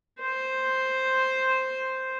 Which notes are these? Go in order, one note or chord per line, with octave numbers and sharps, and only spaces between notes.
C5